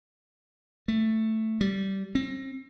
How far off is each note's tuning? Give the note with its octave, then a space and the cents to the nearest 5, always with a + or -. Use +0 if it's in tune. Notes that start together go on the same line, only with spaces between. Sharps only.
A3 +5
G3 -15
C4 +35